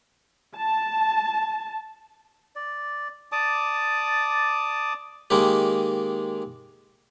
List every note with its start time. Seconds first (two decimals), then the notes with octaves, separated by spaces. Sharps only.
0.58 A5
2.56 D5
3.32 D5 A5 D6 D#6
5.30 D#3 G#3 A#3 D#4 G4